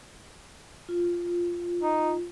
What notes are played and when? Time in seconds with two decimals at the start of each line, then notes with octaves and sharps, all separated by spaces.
0.89 F4
1.83 D#4